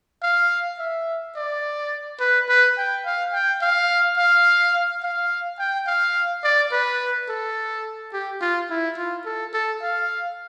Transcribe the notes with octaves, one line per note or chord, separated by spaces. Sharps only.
F5
E5
D5
B4
B4
G5
F5
G5
F5
F5
F5
G5
F5
D5
B4
A4
G4
F4
E4
F4
A4
A4
F5